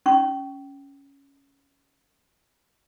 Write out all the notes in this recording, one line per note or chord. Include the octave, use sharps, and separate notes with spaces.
C#4 C#6